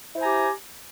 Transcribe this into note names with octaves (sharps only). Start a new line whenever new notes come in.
E4 G4 C5 G#5 A#5